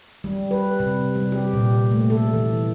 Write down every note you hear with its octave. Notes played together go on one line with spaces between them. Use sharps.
G3
B4
C3
G3
G4
A#2
A3
A4
E3